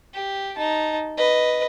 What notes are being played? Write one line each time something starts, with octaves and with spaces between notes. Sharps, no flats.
G4
D#4 A5
B4 D#5